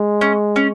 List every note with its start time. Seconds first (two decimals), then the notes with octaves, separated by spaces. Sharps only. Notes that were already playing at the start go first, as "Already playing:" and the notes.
Already playing: G#3
0.21 C#4
0.56 C#4